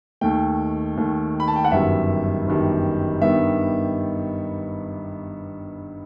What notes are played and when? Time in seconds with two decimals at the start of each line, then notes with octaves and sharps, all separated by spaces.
0.21 D#2 D#3 A3 G5
0.97 D#2 D#3 A3
1.40 B5
1.48 A5
1.56 G5
1.64 F#5
1.72 G1 F#2 D#3 G3 E5
2.47 G1 F#2 D#3 G3
3.21 G2 D#3 G3 B3 E5